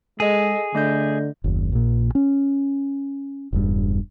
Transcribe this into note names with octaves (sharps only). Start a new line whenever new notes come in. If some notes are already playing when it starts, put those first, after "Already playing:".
G#3 G#4 A4 D#5
D3 A3 D#5 G6
F#1 D#2
A#1 A#2
C#4
E1 G2